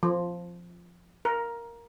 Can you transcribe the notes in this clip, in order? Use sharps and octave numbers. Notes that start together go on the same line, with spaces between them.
F3
A#4